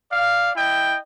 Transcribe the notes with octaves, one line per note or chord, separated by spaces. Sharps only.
D5 F5
E4 D#5 G5